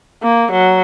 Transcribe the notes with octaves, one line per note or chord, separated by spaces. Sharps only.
A#3
F#3